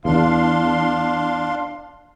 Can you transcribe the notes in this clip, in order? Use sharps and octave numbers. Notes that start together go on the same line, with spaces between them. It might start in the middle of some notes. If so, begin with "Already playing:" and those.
E2 D4 F5 C6